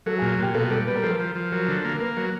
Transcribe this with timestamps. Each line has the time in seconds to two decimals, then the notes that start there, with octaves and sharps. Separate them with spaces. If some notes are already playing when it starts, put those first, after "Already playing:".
0.06 F#3 A4
0.18 G#4
0.22 A#2
0.39 A#2 G4
0.54 B2 A4
0.70 G3 A4
0.87 G3 B4
0.95 A#4
1.03 F3 A4
1.11 A#4
1.20 F3
1.35 F3
1.52 F#3 A#4
1.68 D3
1.84 A#3
1.96 A#4
2.00 A#3 B4
2.16 F#3 A#4